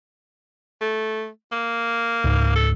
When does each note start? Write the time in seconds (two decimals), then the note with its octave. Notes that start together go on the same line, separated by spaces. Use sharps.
0.81 A3
1.52 A#3
2.24 C#2 G#2
2.55 A4